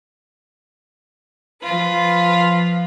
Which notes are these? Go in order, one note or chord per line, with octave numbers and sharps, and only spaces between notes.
F3 F4 B4